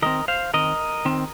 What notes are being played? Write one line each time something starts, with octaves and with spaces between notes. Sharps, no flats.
D#3 G#3 C4 A#4 D#5
C5 F5
D#3 C4 A#4 D#5
D#3 C4